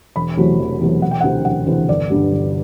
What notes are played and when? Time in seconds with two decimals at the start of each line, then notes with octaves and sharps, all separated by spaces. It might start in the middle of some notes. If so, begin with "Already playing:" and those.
0.16 E1 B5
0.37 E2 C3 F#3 A3
0.59 E1
0.81 E2 C3 F#3 A3
1.02 E1 F#5
1.11 G5
1.21 D2 C3 E3 F#5
1.45 E1 F#5
1.66 D2 C3 E3
1.89 G1 D5
2.10 G2 D3 G3
2.32 G1